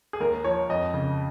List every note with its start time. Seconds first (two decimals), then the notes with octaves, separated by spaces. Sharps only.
0.13 G#4
0.20 D#2 A#4
0.44 F3 C#5
0.69 F2 D#5
0.94 C#3